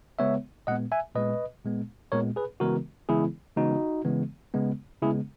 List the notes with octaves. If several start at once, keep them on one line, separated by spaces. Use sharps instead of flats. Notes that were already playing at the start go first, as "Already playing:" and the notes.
C#3 G#3 B3 C#5 E5
A#2 G#3 B3 D#5 F#5
E5 G#5
A#2 G#3 B3 B4 D#5
A#2 G#3 B3
A#2 G#3 B3 A#4 C#5
G#4 B4
C#3 E3 G#3 B3 F#4 A#4
C#3 E3 G#3 B3 E4 G#4
C#3 E3 G#3 B3 D#4 F#4
C#3 E3 G#3 B3
C#3 G#3 B3
C#3 G#3 B3 E4 G#4